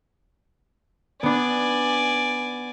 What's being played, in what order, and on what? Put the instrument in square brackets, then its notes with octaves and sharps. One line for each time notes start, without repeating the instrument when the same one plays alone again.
[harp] B3 D4 [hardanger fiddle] D5 G#5